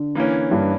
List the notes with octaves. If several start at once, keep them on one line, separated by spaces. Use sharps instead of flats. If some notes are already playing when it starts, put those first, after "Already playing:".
Already playing: D3
E3 A#3 C#4
G2